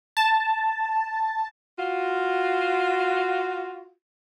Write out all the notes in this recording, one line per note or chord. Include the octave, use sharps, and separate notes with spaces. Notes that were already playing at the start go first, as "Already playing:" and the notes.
A5
F4 F#4